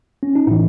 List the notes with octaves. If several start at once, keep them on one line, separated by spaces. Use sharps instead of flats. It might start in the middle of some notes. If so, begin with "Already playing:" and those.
C#4
D#4
A2 E3 E4